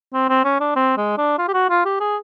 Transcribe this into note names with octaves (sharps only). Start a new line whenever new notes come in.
C4
C4
C#4
D4
C4
G#3
D4
F4
G4
F#4
F4
G4
G#4